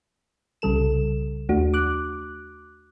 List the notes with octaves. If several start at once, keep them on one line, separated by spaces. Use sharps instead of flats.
C2 C#3 G3 A4 E7
D#2 A3 D4 F#4
D6 F#6